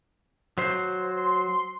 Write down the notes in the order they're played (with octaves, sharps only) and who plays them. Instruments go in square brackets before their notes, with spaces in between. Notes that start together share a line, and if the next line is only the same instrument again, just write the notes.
[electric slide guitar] F#3 C5
[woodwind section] C6